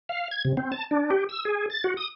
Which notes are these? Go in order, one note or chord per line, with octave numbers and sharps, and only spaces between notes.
F5
G#6
C3
C4
A5
D4
G4
E6
G#4
A6
F#4
D#6